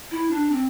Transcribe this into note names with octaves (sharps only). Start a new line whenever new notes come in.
E4
D4
C4